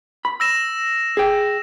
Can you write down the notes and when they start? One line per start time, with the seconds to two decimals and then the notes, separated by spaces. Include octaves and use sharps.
0.25 B5
0.40 E6 A#6 E7
1.17 G#4 G5